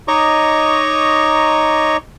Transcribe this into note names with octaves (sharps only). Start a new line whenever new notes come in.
D#4 C#5 D#5 A#5 C#6 D6